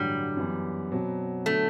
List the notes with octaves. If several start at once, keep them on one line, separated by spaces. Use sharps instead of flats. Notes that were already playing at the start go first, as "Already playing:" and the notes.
Already playing: A1 G2 D3 F#3 G3
F#2 E3 B3
B2 F#3 C4
D3 F#3 A3 B3